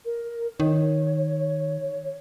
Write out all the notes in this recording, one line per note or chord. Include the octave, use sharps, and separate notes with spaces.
A#4
D#3 C#5